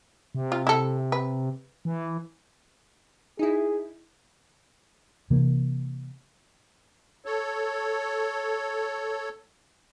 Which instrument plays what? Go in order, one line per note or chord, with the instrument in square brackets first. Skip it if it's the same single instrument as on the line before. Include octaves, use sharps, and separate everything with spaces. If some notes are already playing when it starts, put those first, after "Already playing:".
[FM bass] C3
[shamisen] F4
E4 A4
B4
[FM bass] E3
[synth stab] D#4 E4 [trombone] G#4
[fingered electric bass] C3 E3 A#3
[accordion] A4 C#5